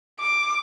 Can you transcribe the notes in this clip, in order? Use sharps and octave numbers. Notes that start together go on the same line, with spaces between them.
D6